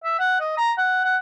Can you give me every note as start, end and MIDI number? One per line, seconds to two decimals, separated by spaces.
0.04 0.16 76
0.19 0.38 78
0.40 0.53 75
0.57 0.72 82
0.78 1.00 78
1.04 1.17 78